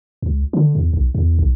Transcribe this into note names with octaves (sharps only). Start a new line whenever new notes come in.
C#2
D3
E2
B1
E2
B1